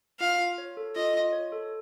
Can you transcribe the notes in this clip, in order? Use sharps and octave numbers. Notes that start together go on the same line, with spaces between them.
F4 F5
F4
C#5
A4
F4 D#5
F4
C#5
A4